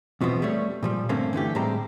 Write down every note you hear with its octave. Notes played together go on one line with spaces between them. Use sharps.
E2 B2 F3 B3 C4
G3 A3 C#5
A#2 F3 G3
G2 D3 A3 A#3 C4 C#4
D3 E3 A3 G4
A2 G3 G#3 C4 A#5